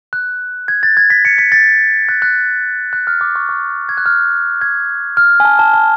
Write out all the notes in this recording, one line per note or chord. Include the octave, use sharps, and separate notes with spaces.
F#6
G#6
A6
G#6
B6
C#7
B6
A6
F#6
F#6
F#6
F6
D6
C#6
C#6
G#6
F#6
F6
G#6
F6
G#5
A5
A5
A5